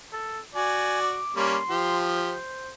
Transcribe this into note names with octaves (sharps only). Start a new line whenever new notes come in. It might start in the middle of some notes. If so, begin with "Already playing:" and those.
A4
F#4 D5 G#5
D6
G3 A#3 C#4 C6
F3 G4
C5